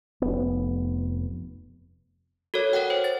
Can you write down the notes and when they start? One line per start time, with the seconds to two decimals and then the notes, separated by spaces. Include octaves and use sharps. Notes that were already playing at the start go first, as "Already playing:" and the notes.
0.22 F1 B3
2.54 F#4 A4 A#4 C#5
2.73 A#4 C#5 F#5 G5
2.90 C5
3.04 A6